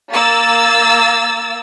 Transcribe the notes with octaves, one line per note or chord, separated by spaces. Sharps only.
A#3 E6 A6